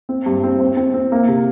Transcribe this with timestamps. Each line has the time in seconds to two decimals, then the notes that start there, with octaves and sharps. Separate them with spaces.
0.09 C4
0.26 G2
0.44 C4
0.60 C4
0.77 C4
0.94 C4
1.12 A#3
1.28 C3